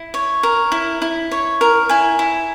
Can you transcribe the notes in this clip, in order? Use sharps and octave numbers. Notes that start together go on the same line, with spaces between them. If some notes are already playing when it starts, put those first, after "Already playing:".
Already playing: E4
C#5
A#4
E4
E4
C#5
A#4
E4 G#5
E4